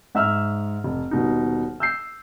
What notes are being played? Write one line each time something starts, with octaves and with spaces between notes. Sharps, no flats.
G#2 E5 E6 F6
F1
D#1 B2 D#4
E6 G6 C7